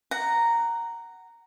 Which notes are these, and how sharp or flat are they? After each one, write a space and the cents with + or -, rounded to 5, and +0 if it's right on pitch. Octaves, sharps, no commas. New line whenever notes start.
F#5 +15 A#5 -5